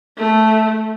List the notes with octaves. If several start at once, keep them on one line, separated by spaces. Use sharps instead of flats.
A3